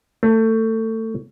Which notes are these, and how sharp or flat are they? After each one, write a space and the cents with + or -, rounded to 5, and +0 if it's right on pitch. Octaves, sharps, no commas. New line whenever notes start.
A3 +25